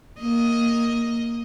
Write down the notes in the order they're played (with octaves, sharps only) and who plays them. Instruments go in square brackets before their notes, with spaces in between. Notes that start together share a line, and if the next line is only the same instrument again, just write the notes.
[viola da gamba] A#3 D#5